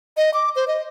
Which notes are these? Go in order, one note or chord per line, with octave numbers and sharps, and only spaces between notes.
D#5
D6
C5
D#5